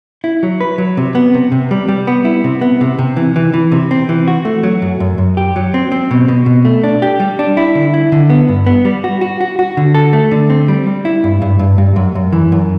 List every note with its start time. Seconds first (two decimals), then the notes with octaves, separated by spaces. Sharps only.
0.24 E4
0.43 F#3
0.61 B4
0.78 F#3
0.97 C3
1.15 B3
1.34 C3
1.52 C3
1.71 G3
1.88 G3
2.07 B3
2.25 E4
2.44 C3
2.61 B3
2.81 C3
2.99 C3
3.16 E3
3.36 E3
3.54 E3
3.72 C3
3.91 C4
4.09 E3
4.28 F#4
4.45 A3
4.63 F#3
4.82 F#2
5.00 F#2
5.18 F#2
5.37 G4
5.56 F#3
5.74 C4
5.92 C4
6.11 B2
6.28 B2
6.46 B2
6.65 A3
6.84 D4
7.02 G4
7.20 G3
7.39 D4
7.57 E4
7.75 D3
7.94 E4
8.12 D3
8.30 B3
8.49 G2
8.66 B3
8.85 G3
9.04 F#4
9.21 F#4
9.41 F#4
9.59 F#4
9.77 D3
9.95 A4
10.13 A3
10.31 D3
10.50 C4
10.68 G3
10.87 G3
11.05 E4
11.24 G2
11.42 G2
11.59 G2
11.78 G2
11.96 F#2
12.15 F#2
12.33 E3
12.52 F#2